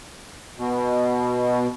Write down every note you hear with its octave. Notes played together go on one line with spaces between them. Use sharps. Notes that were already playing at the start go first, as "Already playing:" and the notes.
B2